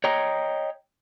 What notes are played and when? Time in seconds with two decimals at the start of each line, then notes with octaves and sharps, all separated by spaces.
0.04 C#5 D#5 G5 A#5